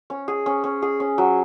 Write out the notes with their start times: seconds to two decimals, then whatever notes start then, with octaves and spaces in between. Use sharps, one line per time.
0.10 C#4
0.28 G#4
0.46 C#4
0.64 C#4
0.82 G#4
1.00 C#4
1.18 F#3